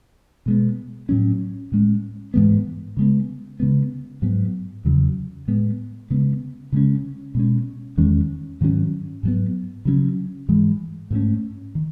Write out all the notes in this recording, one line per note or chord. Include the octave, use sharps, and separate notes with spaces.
B2 G#3 B3
A2 F#3 C#4
A2 G#3 C#4
G#2 E3 G#3 B3
C#3 G#3 B3
C#3 G#3 B3
G#2 F#3 B3
E2 C#3 F#3
A2 G#3 B3
C#3 G#3 B3
C#3 G#3 C#4
B2 G#3 C#4
E2 D#3 G#3 C#4
G#2 D#3 F#3 C#4
G#2 F#3 B3
C#3 F#3 C#4
G#2 E3 G#3
G#2 F#3 A3 C#4
D#3